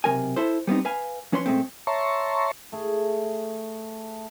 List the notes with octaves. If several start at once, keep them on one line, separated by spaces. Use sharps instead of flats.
B1 C3 G#3 A#4 G#5
E4 A4 C5
G3 B3 C4 D#4
B4 F5 G#5
F3 C#4 B4 C#5 C6
A#2 G#3 A3 C4
C#5 E5 A5 A#5 C6 C#6
A3 G#4